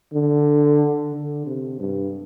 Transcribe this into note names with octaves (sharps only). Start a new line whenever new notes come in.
D3
D3
C3
G2